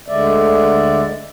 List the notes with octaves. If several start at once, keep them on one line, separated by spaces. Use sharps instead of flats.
D2 D3 G#3 D5 E5